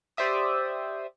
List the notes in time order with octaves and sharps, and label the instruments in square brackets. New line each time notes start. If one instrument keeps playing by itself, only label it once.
[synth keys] G4 C5 D5 E5 D#6